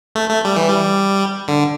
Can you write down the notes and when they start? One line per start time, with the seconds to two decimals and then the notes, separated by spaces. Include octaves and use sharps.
0.15 A3
0.30 A3
0.45 G3
0.56 E3
0.69 G3
1.48 D3